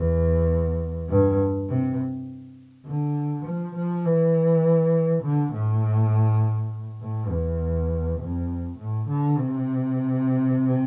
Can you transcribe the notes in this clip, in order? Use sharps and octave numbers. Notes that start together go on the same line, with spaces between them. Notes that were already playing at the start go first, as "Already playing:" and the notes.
Already playing: E2
G2
C3
D3
F3
F3
E3
D3
A2
A2
E2
F2
A2
D3
C3